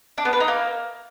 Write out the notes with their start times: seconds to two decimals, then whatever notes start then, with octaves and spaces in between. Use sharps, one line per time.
0.18 D4
0.25 B3
0.33 B4
0.40 D#4
0.48 A#3